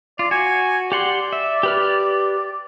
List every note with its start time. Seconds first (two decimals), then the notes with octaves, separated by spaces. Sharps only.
0.19 F4 D5
0.31 F#4 G#5
0.92 G4 D5 F#5 C6
1.33 E5
1.63 G4 B4 F6